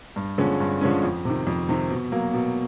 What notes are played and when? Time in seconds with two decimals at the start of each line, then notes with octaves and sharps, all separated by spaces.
0.16 G2
0.38 D3 F3 G#3 C#4
0.60 G2
0.81 D3 F3 G#3 C#4
1.03 F2
1.25 C3 D#3
1.47 F2
1.69 C3 D#3
1.91 B2
2.12 F#3 A#3
2.34 B2